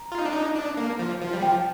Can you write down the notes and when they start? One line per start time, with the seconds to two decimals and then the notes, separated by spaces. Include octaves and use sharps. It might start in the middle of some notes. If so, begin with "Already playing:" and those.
Already playing: A#5
0.12 F4
0.19 D#4
0.26 D4
0.33 D#4
0.55 D4
0.77 A#3
0.99 F3
1.21 F3
1.33 G3
1.42 F3 G5